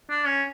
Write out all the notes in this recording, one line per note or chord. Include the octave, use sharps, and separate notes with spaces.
D4
C#4